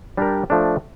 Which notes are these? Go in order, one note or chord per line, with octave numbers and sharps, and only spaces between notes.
G3 D4 G4 A#4
F3 A3 D4